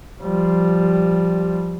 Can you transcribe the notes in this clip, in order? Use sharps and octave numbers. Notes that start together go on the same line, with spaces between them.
F3 G3